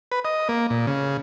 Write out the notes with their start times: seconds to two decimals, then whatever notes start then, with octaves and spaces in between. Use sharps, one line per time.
0.12 B4
0.25 D#5
0.49 A#3
0.70 A#2
0.87 C#3